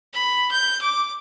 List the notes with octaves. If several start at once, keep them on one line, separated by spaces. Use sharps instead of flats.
B5
G6
D6